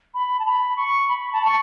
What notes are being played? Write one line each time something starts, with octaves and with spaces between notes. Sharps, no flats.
B5
A5
B5
C#6
B5
A5
C#6